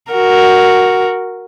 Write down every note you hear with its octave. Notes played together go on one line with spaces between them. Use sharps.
F#4 A#4